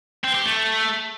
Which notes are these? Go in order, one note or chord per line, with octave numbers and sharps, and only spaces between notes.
C4
G4
A3